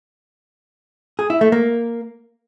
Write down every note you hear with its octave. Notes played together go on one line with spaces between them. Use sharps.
G#4
E4
A3
A#3